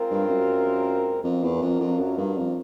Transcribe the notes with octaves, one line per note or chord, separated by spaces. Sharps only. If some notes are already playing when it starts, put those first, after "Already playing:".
Already playing: G#3 C4 F4 A#4
G2
F#2
F2 F#3 B3 D4 F4 A#4
E2
F2
F2
F#2
G2
F2